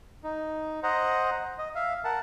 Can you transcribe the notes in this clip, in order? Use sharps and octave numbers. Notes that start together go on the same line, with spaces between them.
D#4
C5 D#5 F#5 A#5
D#5
E5 F5
A#4 F#5 A5